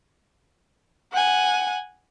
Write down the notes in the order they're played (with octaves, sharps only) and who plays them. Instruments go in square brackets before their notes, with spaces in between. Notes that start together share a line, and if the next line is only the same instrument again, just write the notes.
[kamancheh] F#5 G#5